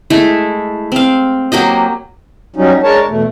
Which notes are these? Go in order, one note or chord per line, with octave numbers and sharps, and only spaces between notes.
G#3 A3 E4
C4 F5
F#3 A#3 G4 D#5
F#3 G3 C#4 D#4
G#3 D4 A#4 C#5 A5
E2 B2 A3